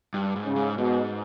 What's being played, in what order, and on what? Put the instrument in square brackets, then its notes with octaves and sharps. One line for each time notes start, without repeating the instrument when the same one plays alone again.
[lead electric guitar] G2
G#2
[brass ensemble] C#3
[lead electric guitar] G#2
[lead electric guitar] G#2 [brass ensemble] B2